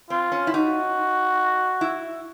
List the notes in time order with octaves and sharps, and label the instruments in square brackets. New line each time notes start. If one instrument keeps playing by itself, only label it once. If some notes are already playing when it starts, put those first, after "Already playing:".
[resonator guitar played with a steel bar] C4 [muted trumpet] F4
[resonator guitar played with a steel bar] C#4
E4
[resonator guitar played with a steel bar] D#4 [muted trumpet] F#4
[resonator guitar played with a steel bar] E4